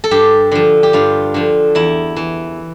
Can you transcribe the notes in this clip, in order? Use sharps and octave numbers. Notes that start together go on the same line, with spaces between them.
A4
G2 G4
D3 F3
G4
G2 F4
D3 F3
E2 E4
E3